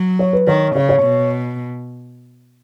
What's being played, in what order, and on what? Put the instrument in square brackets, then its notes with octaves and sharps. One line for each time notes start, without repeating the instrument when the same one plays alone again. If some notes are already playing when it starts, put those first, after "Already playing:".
Already playing: [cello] F#3
[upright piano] C#5
B4
[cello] D#3 [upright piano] C#5
[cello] C#3 [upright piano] C#5
[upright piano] C#5
[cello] B2